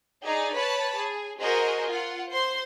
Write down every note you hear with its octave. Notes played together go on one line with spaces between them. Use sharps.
D#4 G#4 D5
B4 C#5 A5 B5
G#4
F#4 G#4 A#4 C5 D#5
F4 F#5
C5 C6